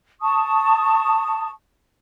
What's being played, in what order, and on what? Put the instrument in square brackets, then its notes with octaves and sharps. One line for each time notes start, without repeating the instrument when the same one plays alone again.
[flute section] A5 C#6 D#6